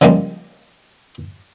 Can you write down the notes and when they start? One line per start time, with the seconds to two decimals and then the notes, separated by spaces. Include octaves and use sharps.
0.01 C#3 F3 G3 G#3 A#3